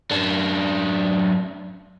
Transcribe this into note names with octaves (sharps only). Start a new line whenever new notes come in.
F#2 D4